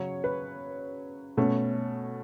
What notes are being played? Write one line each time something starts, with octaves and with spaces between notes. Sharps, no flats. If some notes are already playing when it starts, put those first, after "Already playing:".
Already playing: C#3 F#3 C#4 C#5
B4
B2 A3 C#4